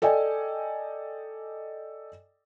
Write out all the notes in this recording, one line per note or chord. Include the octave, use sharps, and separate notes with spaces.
A4 D5 D#5 G5 G#5